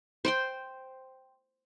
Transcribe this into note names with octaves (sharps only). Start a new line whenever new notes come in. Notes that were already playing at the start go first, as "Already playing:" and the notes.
C5 G5 C6